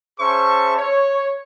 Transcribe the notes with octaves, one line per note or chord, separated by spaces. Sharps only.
C#4 G#4 C5 E5 A5 C#6
C#5